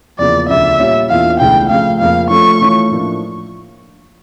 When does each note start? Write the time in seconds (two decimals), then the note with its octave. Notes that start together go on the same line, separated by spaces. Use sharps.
0.19 E2 C#3 F3 A#3 D5
0.49 D2 C#3 F3 E5
0.79 A#2 G3 C#4 F4 C#5
1.10 E2 E3 A#3 D4 F4 F5
1.40 C#2 C#3 E3 A3 D4 G5
1.70 C#3 F3 A3 F5
2.00 F2 C#3 F3 A#3 F5
2.30 F3 A3 C#4 F4 A4 C#6
2.61 E3 A3 C#4 F4 C#5
2.91 A2 F3 A#3 D4